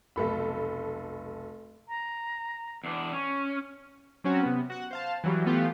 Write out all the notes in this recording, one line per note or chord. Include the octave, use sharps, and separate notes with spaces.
F1 B1 A4 B5
A#5
E2 D4
C#4 C#6
F#3 C4 C#4 F#4
C3 B3
F#4 F#5
C5 F5 A5
E3 F#3 G3
E3 A3 B3 F4 G4